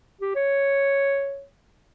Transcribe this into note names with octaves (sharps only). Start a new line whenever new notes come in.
G4
C#5